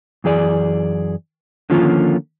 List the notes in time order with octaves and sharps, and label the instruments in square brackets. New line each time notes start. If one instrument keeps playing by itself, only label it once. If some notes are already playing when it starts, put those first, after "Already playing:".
[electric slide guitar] F#2 E3 G#4 D5
D3 D#3 F3 A#3 C#4 F4